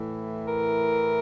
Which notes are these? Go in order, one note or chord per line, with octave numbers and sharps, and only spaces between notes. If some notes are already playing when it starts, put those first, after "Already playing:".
Already playing: A2 E3
A#4